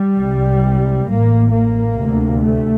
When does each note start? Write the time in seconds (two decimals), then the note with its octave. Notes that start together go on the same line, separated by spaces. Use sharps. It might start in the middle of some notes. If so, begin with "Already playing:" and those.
Already playing: G3
0.19 C2 C3
1.08 A1 A2 A#3
1.53 A#3
1.97 D2 C3
2.42 A3